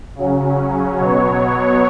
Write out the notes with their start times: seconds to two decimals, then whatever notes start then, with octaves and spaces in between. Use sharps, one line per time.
0.15 C#3 F#3 C#4
0.98 B2 F#3 B3 C#5